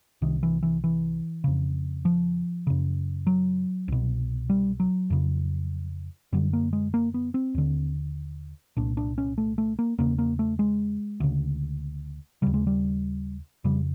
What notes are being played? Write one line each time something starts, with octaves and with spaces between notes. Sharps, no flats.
C2 C3 D#3
E3
E3
E3
F2 C#3
F3
F#2 C#3
F#3
C2 B2
G3
F#3
F2 C#3
F#2 D3 G3
A#3
G#3
A#3
B3
C4
D#2 D3
C2 A#2 D4
D4
C#4
A3
A3
A#3
E2 C#3 A#3
A#3
A3
G#3
D2 C#3
D#2 C#3 G3
G#3
G3
F2 C#3 G3